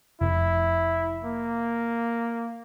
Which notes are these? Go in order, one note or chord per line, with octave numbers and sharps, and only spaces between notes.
F1 E4
A#3